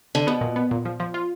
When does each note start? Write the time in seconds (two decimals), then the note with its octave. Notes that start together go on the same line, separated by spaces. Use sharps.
0.15 D3
0.27 B2 B3
0.41 A#2
0.56 B3
0.71 A#2
0.85 F3
1.00 F3
1.14 F4